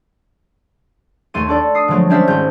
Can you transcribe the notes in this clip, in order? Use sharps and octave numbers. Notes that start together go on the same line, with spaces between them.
D#2 A3 A4 C6 D#7
D4 A4 D5
D#6 C7
D3 F3 F#3 G#3 A3
G3 G#3 C#4 D4 C5 E5
G#1 G6